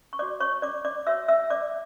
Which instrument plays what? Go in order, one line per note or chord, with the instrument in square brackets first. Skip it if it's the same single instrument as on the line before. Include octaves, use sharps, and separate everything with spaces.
[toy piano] C#6
C#5 D5 D6
F#4
C#5 C#6
D5 D6
D5 D6
F#4 C#5 E5 E6
E5 E6
D5 D6